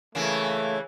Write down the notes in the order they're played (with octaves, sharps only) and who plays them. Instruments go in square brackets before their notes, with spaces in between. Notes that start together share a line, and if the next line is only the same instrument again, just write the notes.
[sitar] C#3 E3 A#3 [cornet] A3